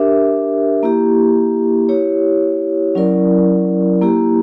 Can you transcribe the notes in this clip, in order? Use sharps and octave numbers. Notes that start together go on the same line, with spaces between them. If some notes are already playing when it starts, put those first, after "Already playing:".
Already playing: D4 G4 A#4 E5
A#3 E4 G4
E4 G4 C#5
F#3 C#4 E4 A#4 D5
A#3 E4 G4